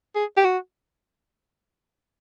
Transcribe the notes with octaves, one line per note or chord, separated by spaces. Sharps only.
G#4
G4
F#4